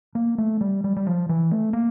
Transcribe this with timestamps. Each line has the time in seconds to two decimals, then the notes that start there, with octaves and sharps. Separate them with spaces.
0.15 A#3
0.38 A3
0.61 G3
0.84 G3
0.96 G3
1.07 F3
1.29 E3
1.51 A3
1.73 A#3